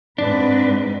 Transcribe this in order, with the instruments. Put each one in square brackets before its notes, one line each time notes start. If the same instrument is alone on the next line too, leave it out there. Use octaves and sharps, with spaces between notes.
[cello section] G#2 C4 B4 [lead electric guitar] D4